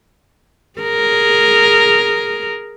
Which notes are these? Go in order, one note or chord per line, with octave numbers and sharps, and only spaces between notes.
G#4 A#4